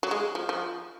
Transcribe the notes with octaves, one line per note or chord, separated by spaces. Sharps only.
F#3
G#3
F3
F3